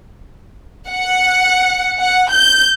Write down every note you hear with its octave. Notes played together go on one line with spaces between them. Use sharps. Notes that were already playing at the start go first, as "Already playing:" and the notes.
F#5
F#5
G6